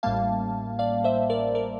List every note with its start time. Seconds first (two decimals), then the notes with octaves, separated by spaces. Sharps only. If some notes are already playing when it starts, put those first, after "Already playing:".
0.03 A1 A2 G3 A#3 F5 A5
0.79 D5 F5
1.04 C5 E5
1.30 A#4 D5
1.55 A#4 D5